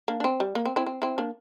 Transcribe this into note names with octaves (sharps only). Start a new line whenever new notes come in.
A#3 D4
D4
C4
G3
A#3
C4
C4 E4
C4
C4 E4
A#3 D4